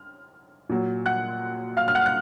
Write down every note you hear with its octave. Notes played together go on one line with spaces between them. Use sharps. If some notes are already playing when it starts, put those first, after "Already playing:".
Already playing: F6
A#2 F#3
F#5 F#6
F5 F6
F6
F#5 F#6
F#6